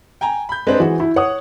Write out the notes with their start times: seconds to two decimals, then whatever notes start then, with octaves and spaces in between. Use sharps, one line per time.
0.21 G5 G#5 A#5
0.49 B5 G6
0.67 G#3 C4 D4 B4 C5
0.80 E3 F#4 G#4
1.00 E4
1.16 C#5 F#5 D#6